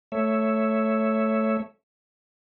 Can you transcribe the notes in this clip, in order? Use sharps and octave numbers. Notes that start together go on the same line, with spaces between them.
A3 C#5 E5